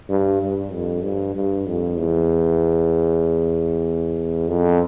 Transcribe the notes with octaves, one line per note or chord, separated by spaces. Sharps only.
G2
G2
F2
G2
G2
F2
E2
F2